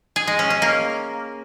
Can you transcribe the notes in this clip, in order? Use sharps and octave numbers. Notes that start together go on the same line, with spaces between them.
G#4
G#3
C#4
C#4
A#3